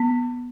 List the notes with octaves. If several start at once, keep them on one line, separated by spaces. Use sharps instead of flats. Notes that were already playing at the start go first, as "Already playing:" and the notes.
Already playing: B3